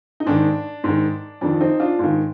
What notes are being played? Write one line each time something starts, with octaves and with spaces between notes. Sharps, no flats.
D#4
G#2 D#3 D4
G#2 D#3
F2 D#3 D4
C4 D#4
D4 F4
G#2 D#3